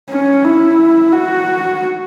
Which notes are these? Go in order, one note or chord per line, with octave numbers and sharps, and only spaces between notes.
C#4
E4
F#4